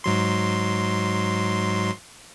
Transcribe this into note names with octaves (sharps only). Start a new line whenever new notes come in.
G#2 F#3 C6